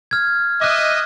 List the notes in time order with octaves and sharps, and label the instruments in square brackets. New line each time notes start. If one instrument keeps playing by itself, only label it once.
[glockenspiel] F6 G#6
[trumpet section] D#5 E5 [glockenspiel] D6 F#6